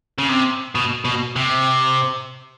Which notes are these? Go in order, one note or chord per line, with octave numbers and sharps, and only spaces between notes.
C#3
C3
B2
B2
C3